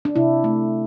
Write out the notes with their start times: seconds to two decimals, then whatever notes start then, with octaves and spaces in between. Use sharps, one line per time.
0.05 D4
0.16 C3 E4
0.44 A3